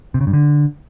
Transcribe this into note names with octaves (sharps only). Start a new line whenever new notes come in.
C3
C#3
G2
D3